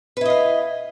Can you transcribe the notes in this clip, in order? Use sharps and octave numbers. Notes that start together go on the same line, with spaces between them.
E4 B4 D#5 F5